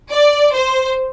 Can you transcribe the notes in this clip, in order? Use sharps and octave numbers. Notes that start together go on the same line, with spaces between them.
D5
C5